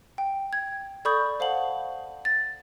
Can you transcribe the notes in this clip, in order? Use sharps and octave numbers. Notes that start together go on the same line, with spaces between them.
G5
G#6
A4 D5 B5 C#6 D#6 G6
A4 C5 F5 F#5 A5 F#7
A6